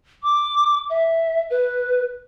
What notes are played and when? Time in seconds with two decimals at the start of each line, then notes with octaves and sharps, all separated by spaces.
0.23 D6
0.90 E5
1.50 B4